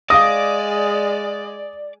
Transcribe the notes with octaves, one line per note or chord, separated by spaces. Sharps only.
G#3 D5 F5 D#6 A#6